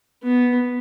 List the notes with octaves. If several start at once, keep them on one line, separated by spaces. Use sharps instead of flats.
B3